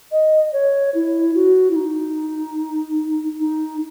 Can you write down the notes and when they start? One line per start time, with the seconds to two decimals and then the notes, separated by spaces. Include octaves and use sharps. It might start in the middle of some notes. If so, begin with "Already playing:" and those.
0.12 D#5
0.53 C#5
0.94 E4
1.35 F#4
1.71 E4
1.76 D#4
3.40 D#4